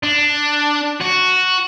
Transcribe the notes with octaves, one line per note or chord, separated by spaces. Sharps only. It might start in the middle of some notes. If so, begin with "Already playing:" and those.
D4
F#4